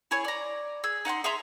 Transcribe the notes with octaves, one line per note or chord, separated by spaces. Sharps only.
E4 G#4 C#5
D5 A#5
G#4 E6
D#4 F#5 G5 C6
G#4 E5 A#5 C6